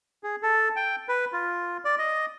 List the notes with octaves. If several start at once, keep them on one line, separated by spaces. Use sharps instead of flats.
G#4
A4
G5
B4
F4
D5
D#5